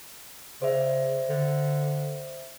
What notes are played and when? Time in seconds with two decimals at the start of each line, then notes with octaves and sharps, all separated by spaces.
0.62 C#3 C5 D5 E5
1.29 D3